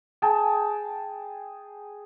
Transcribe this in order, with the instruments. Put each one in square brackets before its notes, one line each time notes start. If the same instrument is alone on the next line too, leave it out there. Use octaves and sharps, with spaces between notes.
[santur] G#4 G5 A5